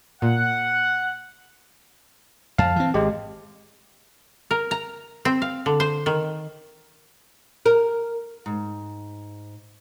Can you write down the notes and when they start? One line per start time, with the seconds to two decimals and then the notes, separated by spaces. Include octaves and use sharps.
0.22 A#2 F#5
2.58 F2 F5 A5
2.76 E3 C4
2.94 G#1 G#3 G4
4.51 A#4
4.71 A#5
5.25 C4
5.42 F5
5.66 D3
5.80 C5
6.06 D#3
7.66 A#4
8.46 G#2